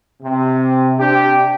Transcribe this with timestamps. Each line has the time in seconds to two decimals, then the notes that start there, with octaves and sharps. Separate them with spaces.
0.22 C3
0.98 C3 D4 G4